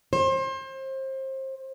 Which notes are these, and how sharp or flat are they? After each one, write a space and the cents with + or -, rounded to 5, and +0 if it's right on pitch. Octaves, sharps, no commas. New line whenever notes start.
C5 +30